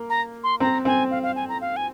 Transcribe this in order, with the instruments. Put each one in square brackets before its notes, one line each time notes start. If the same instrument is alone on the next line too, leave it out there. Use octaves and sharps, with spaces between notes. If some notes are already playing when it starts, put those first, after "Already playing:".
Already playing: [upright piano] A#3
[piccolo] A#5
C6
[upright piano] C4 [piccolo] A#5
[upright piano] C4 [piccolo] G#5
[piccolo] F5
F5
G#5
A#5
F5
G#5